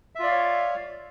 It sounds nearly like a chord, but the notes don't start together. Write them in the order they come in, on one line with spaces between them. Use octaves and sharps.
E5 F4 D5 F5 C#5